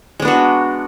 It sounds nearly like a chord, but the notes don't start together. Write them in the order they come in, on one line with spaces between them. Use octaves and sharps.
G#3 D4 B3 F#4